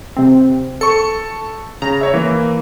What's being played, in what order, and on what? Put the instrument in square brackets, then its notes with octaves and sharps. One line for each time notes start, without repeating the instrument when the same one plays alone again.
[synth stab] C3 C4
[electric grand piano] A4 C#6 [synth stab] C#7
[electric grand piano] C#3 [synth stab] A#5
[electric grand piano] C#5 E5
E3 A#3